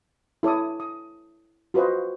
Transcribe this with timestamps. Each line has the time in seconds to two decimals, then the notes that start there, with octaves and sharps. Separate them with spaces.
0.43 E4 A4 C#5 D6 D#6
0.80 D#6
1.74 F4 F#4 B4 C5 D#5